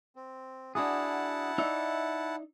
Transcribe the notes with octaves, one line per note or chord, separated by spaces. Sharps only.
C4
D4 E4 F#4 G#4 F#5 A5
D#4 D5 E5